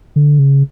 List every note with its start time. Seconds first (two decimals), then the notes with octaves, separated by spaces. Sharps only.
0.16 D3
0.39 C#3